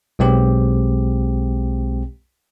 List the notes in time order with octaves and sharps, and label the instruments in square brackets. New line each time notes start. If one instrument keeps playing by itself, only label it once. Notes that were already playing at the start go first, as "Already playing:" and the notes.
[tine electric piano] B1 G#3 C4 G4